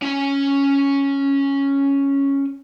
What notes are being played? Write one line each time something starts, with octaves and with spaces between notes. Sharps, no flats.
C#4 G#5